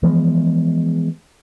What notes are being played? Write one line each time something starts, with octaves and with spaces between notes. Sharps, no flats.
E3 F3 G#3 B3